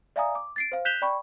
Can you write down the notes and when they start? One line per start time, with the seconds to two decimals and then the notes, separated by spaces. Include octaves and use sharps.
0.16 D5 E5 F5 G#5 A#5 D#6
0.35 D6
0.56 A6 C7 D7
0.72 C5 F5
0.85 F#6 G6 B6 E7 F7 G7
1.02 D5 G5 B5 C#6